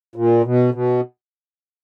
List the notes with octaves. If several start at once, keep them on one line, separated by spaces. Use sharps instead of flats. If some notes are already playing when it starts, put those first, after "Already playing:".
A#2
B2
B2